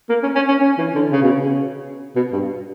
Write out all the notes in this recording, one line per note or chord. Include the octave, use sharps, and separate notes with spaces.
A#3
C#4
C#4
C#4
C#4
E3
D3
C#3
B2
C#3
B2
G2